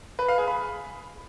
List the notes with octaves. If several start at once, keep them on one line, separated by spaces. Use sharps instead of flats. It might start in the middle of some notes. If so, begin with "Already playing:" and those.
B4
F5
G#4
B5